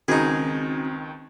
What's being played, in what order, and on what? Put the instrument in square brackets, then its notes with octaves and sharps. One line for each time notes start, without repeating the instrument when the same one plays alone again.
[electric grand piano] C#2 D#3 [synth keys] C4 [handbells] C#4 F#4 [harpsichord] D#4 G#4